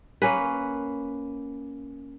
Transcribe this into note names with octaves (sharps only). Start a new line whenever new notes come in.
A#3 C#4 B4